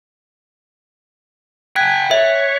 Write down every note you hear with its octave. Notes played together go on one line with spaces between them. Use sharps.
G5 G#5 F#6 G#6 B6
C#5 E5